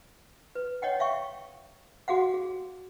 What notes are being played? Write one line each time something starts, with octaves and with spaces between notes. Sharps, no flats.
B4
C#5 D#5 F#5 G5
E5 F5 G5 C#6
F#4 G#4 F5 F#5
G#4